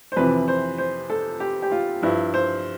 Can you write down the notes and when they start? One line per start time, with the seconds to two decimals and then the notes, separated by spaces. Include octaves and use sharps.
0.12 C5
0.16 F2 C3 E3 B4
0.48 C5
0.78 C5
1.10 A4
1.40 G4
1.62 G4
1.71 F4
2.02 G2 F3 E4
2.34 C5